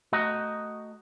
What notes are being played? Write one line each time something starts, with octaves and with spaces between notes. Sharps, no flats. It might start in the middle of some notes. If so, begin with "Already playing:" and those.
A3 F#4 D#5 A#5